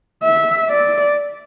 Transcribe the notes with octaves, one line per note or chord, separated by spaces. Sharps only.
E5
D5